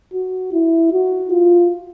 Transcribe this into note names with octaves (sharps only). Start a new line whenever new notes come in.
F#4
E4
F#4
F4